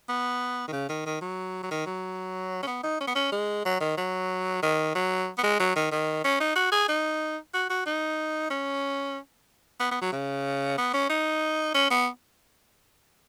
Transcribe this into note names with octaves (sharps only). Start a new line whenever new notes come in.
B3
D#3
C#3
D#3
D#3
F#3
F#3
D#3
F#3
C#4
B3
D#4
C#4
B3
C#4
G#3
F#3
D#3
F#3
D#3
F#3
B3
G#3
F#3
D#3
D#3
C#4
D#4
F#4
G#4
D#4
F#4
F#4
D#4
C#4
B3
B3
F#3
C#3
B3
C#4
D#4
C#4
B3